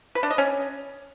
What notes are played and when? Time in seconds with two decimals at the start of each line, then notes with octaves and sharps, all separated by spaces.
0.15 B4
0.23 D4
0.31 D#5
0.38 C#4